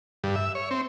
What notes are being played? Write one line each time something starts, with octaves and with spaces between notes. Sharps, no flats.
G2
E5
C#5
C4